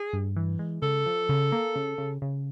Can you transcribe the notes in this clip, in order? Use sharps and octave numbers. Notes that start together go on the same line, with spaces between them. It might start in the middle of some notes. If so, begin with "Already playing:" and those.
Already playing: G#4
G2
E3
G#3
C#3 A4
F3
C#3
A#3
C#3
C#3
C#3